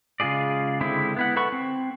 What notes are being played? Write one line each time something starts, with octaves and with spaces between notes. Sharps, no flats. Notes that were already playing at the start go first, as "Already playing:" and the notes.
C#3 G#3 F4 G#4 D5
D3 G#3 C4 E4
B3 E4 F#5
A4 B4 F#5 B5 C#6
C4